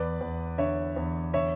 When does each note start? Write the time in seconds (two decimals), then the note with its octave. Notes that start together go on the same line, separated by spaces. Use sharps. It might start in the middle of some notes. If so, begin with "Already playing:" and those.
Already playing: E2 B4 D5
0.21 E2
0.58 D3 C#5 E5
0.96 E2
1.34 D3 C#5 E5